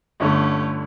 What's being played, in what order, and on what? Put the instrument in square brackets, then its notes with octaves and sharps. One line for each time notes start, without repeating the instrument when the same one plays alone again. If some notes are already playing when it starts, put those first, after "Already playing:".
[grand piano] G1 D3 [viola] A3 C#4